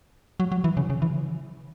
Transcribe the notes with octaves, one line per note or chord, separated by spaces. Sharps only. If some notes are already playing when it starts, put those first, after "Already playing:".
F#3
F#3
E3
C#3
C#3
E3